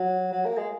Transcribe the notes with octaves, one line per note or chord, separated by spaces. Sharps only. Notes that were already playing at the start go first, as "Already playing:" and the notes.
Already playing: F#3
F#3
A#3
G#3